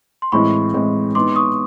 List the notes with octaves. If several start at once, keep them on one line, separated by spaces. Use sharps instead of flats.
C6
A2 E3 G#3 C4 B5 C#6
A2 E3 G#3 C4
G#3 B3 D#4 C6 D6
C#6 D#6